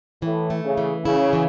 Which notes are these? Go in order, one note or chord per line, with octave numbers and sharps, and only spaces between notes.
A2 E3
A3
C#3
E3
C#3 E4
E3